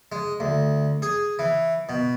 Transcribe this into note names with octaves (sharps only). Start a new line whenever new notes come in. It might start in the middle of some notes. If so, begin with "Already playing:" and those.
G#3
D2
G#4
E3
B2